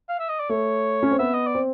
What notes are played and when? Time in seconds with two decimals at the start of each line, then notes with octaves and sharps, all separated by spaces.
0.09 F5
0.19 E5
0.29 D#5
0.40 D5
0.49 A3 C#5
1.03 C#4
1.11 C4
1.19 B3 E5
1.34 D#5
1.47 D5
1.55 C4